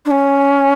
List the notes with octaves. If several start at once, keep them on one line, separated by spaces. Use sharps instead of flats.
D4
C#4